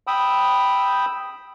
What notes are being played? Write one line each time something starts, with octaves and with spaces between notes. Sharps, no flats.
G5 B5 D#6 E6